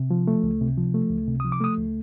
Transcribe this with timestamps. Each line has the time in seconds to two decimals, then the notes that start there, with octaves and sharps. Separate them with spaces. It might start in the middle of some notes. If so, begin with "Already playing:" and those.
Already playing: C3
0.10 F3
0.27 A3
0.43 C#2
0.61 C3
0.77 F3
0.94 A3
1.10 C#2
1.27 C3
1.40 F3 D#6
1.52 D6
1.60 A3 D#6
1.77 C#2